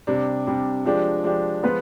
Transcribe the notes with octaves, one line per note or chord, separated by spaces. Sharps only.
C3 G3 D4
C3 G3 D4
F3 G#3 D4 G4
F3 G#3 D4 G4
F3 G#3 B3 F4 B4